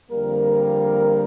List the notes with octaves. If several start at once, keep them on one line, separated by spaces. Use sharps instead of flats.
F2 D3 G3 A#3 A#4